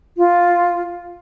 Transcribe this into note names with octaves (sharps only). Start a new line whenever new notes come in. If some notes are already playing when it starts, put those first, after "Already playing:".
F4